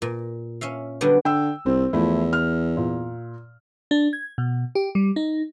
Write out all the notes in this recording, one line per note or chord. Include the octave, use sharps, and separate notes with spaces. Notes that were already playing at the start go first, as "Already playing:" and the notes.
A#2
C#4 E5 F5
D3 F#3 G3 B3 D4
D3 G5 E6
C2 C4
E2 F3 A3 E4
F6
A#2
D4
G#6
B2
G4
G3
D#4